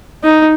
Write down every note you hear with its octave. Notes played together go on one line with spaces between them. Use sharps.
D#4